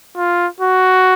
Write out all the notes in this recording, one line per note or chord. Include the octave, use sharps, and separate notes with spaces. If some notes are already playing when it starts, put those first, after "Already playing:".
F4
F#4